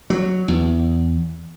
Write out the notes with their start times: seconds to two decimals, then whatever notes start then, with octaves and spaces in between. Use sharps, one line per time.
0.10 F#3
0.48 E2